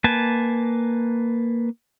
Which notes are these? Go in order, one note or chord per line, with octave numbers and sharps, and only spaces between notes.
A#3 B4 G#5 A5